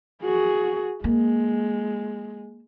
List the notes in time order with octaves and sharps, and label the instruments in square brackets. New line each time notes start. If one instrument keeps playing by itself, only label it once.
[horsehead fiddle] F#4 G#4
[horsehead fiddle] G#3 [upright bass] A#3